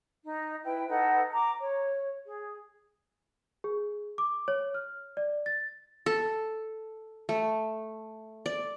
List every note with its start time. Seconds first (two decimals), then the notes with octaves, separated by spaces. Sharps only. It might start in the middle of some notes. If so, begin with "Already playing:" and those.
0.23 D#4
0.63 E4 B4 G5
0.88 D#4 A4 B4 F#5
1.31 A#5 D6
1.60 C#5
2.26 G#4
3.64 G#4
4.18 D6
4.48 C#5
4.75 F6
5.17 D5
5.46 A6
6.06 A4
7.29 A3
8.46 D5